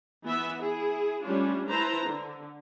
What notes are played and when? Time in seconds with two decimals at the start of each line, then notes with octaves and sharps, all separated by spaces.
0.25 E3 B3 E5
0.62 E4 G#4
1.24 G3 A3 C#4 D4 F4
1.69 E4 B4 C5 A5 A#5
2.06 D3